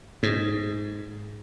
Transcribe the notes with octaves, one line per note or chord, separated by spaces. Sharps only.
G#2